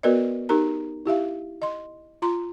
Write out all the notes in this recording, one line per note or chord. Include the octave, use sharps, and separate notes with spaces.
B3 F#4 A#4 B4 D5 D#5
D#4 G4 A#4 A#5
E4 G4 E5 F5
D#5 C6
F4 A#5 C6